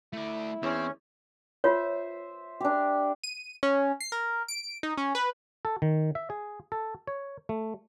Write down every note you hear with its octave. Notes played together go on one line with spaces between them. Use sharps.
A3 E4 D5
E2 C4 C#4 C#5
F4 C5 C#5 E5
D4 G4
D#7
C#4
C7
A#4
D7
D#4
C#4
B4
A4
D#3
E5
G#4
A4
C#5
A3